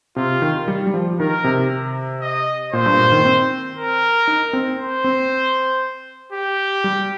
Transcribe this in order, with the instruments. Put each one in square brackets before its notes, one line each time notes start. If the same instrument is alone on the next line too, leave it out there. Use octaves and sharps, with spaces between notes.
[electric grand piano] C3 [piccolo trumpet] F4
[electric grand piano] D#3
G3
G3
F3
[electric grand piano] D#3 [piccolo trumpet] A#4
[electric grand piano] C3
[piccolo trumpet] D#5
[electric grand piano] A#2 [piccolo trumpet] C5
[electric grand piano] G2
A#2
D#3
C4
[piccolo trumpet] A#4
[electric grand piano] D#4
C4
[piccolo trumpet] C5
[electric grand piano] C4
[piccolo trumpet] G4
[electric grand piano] G3